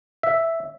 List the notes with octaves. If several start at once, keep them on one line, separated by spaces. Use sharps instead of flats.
E5